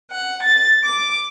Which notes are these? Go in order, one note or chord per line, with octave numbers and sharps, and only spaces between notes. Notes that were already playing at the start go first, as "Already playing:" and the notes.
F#5
A6
D6